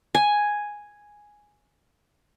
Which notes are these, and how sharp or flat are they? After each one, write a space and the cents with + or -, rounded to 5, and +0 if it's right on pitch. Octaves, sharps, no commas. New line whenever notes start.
G#5 +0